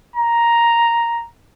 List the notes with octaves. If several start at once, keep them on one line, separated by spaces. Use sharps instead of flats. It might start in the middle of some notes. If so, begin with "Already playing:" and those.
A#5